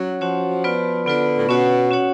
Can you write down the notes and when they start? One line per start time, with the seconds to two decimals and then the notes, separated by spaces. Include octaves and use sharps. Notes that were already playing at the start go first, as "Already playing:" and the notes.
Already playing: F#3 C#4 F#4 C#5 F#5
0.21 F3 C#4 F#4 C#5 F#5
0.64 B3 F4 B4 D5
1.06 D3 B3 F4 B4 D5
1.38 A2
1.48 B2 C#4 F#4 C#5 F#5
1.91 C#4 F#4 C#5 F#5